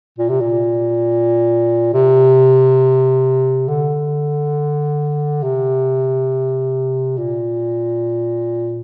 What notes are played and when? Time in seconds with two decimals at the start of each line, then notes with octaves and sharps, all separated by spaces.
0.18 A#2
0.29 C3
0.41 A#2
1.94 C3
3.68 D3
5.43 C3
7.17 A#2